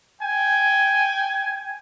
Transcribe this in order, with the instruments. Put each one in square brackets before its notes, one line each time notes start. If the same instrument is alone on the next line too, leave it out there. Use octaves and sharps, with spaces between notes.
[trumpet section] G5 G#5